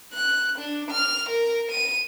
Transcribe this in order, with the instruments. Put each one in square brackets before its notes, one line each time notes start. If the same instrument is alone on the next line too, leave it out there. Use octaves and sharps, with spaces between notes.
[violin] F#6
D4
F6
A#4
D#7